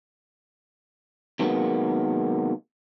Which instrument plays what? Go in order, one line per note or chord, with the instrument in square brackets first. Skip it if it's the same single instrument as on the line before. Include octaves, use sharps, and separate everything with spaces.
[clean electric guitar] C3 D#3 F#3 G#3 A#3 B3